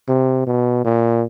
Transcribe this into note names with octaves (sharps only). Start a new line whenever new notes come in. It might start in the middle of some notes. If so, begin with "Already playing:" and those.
C3
B2
A#2